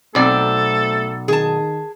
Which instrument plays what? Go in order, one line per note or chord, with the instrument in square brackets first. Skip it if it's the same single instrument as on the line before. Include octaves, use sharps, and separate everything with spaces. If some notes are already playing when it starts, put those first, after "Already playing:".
[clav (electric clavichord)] B1 D5 [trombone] A3 [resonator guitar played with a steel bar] C4 [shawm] A4
[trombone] D#3 [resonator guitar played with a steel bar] G#4 A5